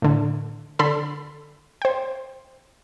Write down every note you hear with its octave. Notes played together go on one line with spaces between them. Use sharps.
A2 D3
D3 A4 B5 C6
C5 G5